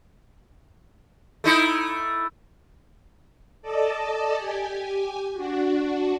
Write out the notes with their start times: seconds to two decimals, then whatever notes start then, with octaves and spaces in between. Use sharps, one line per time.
1.44 A3 D#4 E4
3.62 A4 D5 D#5 A5
4.35 G4 G#5
5.34 D4 F#4